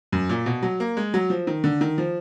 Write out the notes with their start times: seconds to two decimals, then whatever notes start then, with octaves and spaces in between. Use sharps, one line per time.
0.12 F#2
0.29 A#2
0.46 B2
0.62 F#3
0.80 A#3
0.97 G#3
1.14 F#3
1.30 F3
1.47 D#3
1.64 D3
1.81 D#3
1.98 F3